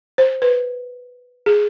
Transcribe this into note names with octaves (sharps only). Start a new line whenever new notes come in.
C5
B4
G#4